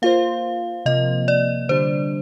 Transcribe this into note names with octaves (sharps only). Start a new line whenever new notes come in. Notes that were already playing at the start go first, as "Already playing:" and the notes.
A#3 F4 C5 F5
C3 F3 A#3 D#5
D5
D3 G3 D4 C5